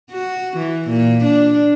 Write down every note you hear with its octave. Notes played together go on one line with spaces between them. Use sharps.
F#4
E3
A#2
D4